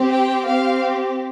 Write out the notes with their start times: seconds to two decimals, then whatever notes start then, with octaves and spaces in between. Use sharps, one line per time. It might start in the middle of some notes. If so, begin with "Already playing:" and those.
Already playing: C4 G4
0.10 G5
0.46 C4 G4 F5